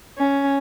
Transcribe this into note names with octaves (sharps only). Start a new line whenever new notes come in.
C#4